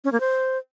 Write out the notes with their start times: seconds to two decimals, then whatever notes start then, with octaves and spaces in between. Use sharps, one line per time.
0.04 C#4
0.12 A#3
0.20 C5